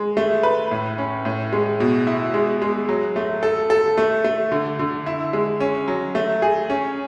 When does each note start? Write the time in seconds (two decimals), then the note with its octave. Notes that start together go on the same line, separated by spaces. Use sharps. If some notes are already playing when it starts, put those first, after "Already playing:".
Already playing: G#3
0.17 A3
0.43 B4
0.71 A2
0.98 C#4
1.25 A2
1.53 G#3
1.80 B2
2.07 E4
2.34 G#3
2.62 G#3
2.89 F#3
3.16 A3
3.43 A4
3.70 A4
3.98 A3
4.24 A3
4.52 D3
4.79 D3
5.06 E4
5.33 G#3
5.60 C#4
5.88 F#3
6.15 A3
6.42 G#4
6.70 C#4